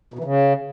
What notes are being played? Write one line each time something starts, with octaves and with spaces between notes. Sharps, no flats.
B2
E3
C#3